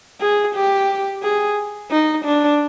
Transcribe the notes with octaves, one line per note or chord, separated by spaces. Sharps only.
G#4
G4
G#4
D#4
D4